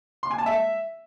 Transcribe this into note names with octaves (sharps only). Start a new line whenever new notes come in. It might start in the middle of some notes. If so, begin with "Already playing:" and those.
C6
G#5
A5
E5